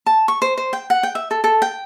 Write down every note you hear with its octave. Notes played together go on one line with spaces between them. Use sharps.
A5
C#6
C5
C5
G5
F#5
G5
E5
A4
A4
G5